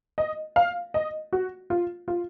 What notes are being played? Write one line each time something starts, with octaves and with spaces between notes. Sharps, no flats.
D#5
F5
D#5
F#4
F4
F4